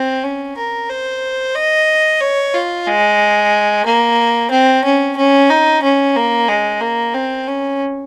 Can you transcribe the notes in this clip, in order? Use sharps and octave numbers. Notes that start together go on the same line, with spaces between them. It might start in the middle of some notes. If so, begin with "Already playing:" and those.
Already playing: C4
C#4
A#4
C5
D#5
C#5
F4
G#3
A#3
C4
C#4
C#4
D#4
C#4
A#3
G#3
A#3
C4
C#4